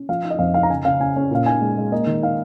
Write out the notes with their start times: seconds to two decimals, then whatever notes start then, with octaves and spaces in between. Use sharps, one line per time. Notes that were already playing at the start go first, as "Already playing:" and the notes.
Already playing: C#4
0.09 F3 F5
0.24 D#4
0.30 D#5
0.39 F2 F5
0.54 D#4 F5
0.63 A#5
0.70 C#3 G#5
0.85 C#3 F5
1.00 C#4 G#5
1.16 C#4
1.31 A#2 F5
1.46 D#4 G#5
1.61 G#3
1.77 G#3
1.92 A#3 D#5
2.07 D#3
2.22 D#4 F5